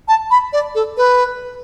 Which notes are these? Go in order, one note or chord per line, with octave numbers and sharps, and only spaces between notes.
A5
B5
D5
A4
B4